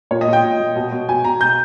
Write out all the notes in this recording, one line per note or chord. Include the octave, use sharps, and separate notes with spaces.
A#2 C#5
D#5
A#2
G5
A#2
A#2
B2
B2
B2 G#5
B2 A#5
B2 G6